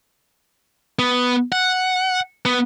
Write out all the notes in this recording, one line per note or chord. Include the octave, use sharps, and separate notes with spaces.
B3
F#5
B3